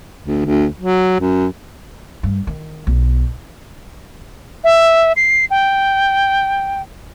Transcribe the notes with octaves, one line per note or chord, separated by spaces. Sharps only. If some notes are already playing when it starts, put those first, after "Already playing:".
D2
D2
F#3
F#2
G2
D#3
B1
E5
C7
G5